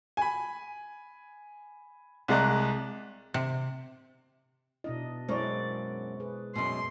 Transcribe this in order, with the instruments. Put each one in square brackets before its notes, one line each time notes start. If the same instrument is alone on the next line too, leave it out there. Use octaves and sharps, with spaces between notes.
[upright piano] G#5 B5
C2 G#3 D5 A#5 F#6
[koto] C3
[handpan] B2 D4 D#5 [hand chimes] E4
[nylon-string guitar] F#2 A#4 [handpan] G#3 E4 D5 [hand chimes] C5 C#6
[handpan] G#4 B4
[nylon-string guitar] F#2 B2 [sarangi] C6